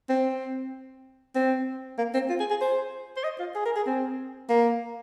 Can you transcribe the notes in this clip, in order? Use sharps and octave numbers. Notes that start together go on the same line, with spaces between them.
C4
C4
A#3
C4
F4
G#4
G#4
C5
C5
D#5
F4
G#4
A#4
G#4
C4
A#3